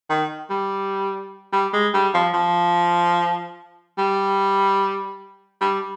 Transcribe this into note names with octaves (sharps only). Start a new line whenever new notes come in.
D#3
G3
G3
G#3
G3
F3
F3
G3
G3